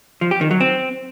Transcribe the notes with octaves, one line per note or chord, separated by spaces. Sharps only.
F3
G4
D#3
F#3
C4